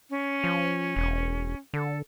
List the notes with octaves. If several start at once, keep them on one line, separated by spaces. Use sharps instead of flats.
C#4
F3
E1
D3 A4